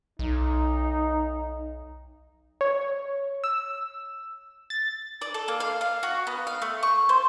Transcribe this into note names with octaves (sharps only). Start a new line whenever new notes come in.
B1 D#4
C#5
E6
A6
D5
A4
A#3
F5
F5
F#4
B3
F5
A3
C#6
C5